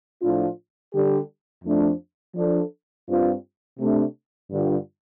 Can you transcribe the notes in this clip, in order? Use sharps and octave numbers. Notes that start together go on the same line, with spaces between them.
A2 F3 D4 F4
D3 G3 D4 G4
F2 F3 A3 D4
F3 D4 A4
G2 G3 C4 F4
C3 A3 D4
G2 D3 G3 F4